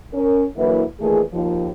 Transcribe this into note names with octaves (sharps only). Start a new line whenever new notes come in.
C#4 A#4
D3 E3 F#3 A#3 E4 B4
A#2 D#3 E3 A3 G#4
D#2 F3